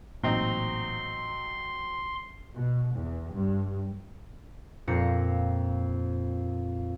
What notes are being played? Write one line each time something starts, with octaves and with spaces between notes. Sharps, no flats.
A1 A#2 F#3 C4 D#4 C6
B2
E2
G2
F2 A#2 C4 A#6 C7 C#7